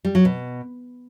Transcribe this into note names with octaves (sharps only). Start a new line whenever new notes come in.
G3
F#3
B2